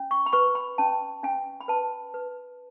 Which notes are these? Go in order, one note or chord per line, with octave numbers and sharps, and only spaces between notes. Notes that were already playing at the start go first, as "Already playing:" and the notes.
Already playing: C#4
C#6
B5
B4 C#6
B5
C#4 A5
C#4 G#5
B5
B4 A5
B4